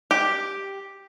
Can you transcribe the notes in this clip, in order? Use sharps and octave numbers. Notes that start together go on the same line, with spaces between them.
G4